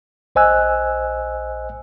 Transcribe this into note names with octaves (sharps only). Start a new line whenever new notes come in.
A#1 C5 D#5 G#5 E6 F#6